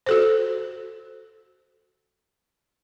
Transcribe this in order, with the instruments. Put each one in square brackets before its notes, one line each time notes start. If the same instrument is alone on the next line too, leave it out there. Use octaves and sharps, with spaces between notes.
[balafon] F#4 A4 C5